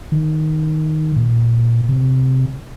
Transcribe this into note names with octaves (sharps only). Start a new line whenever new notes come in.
D#3
A#2
C3